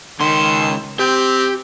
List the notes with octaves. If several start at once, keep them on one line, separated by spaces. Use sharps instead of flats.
C#2 D#3 C6
C4 G4